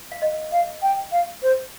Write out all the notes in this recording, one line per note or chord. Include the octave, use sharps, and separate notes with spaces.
F5
D#5
F5
G5
F5
C5